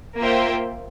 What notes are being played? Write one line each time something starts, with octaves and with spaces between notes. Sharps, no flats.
A#3 F4 C5 E5 G5